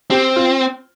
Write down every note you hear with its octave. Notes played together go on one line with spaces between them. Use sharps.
C4 G4
F4